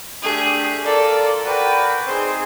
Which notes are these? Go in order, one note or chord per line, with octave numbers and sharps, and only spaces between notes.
A3 D4 G4 G#4
F4 A4 A#4 D5
F#4 A#4 B4 D5 G5
C4 D#4 G#4 C5